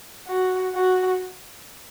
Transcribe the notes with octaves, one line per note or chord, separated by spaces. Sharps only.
F#4
F#4